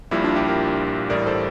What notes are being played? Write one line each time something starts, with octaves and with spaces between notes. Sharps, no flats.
A#1 A#2 G3 E4
D4 F4
E4 G4
G4 A#4
A1 A2 G3 A#4 D5
A4 C5